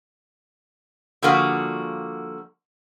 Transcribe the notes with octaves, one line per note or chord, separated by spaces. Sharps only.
D3 F3 G3 A#3 F#4 G#4